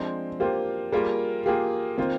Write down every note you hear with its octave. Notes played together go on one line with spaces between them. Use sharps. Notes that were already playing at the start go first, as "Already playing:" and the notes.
Already playing: F3 G#3 C4 D4
A#3 F4 G4 C5
G3 A#3 F4 G#4 A#4
A#3 F4 G4 G#4
D#3 A#3 C4 F4 C5